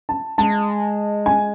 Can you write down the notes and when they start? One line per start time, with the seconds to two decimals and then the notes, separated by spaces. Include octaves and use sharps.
0.09 A5
0.38 G#3 A5
1.26 G#5